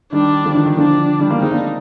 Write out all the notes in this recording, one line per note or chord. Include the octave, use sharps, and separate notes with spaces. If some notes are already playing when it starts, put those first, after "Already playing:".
D#3 G3 D4
D3 F3
D#3
D#3
D3 F3 D4
D#3 G3
G3 A#3
G#3 C4 D#4
A#3 D4